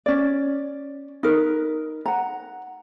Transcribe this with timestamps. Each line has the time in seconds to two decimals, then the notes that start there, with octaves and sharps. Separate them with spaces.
0.06 C#4 D5
1.23 D#4 A#4 B4
2.06 F#5 A#5